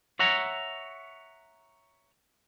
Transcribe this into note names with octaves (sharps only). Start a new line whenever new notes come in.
C#5 E5 F#5 A#5